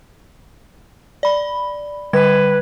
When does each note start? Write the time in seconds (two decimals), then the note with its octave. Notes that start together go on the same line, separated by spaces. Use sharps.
1.23 D5 B5
2.13 D3 G3 B4 G#6